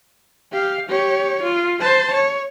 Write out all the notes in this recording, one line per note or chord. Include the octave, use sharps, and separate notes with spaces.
G4 F5
G4 C#5
F4
C5 A5
C#5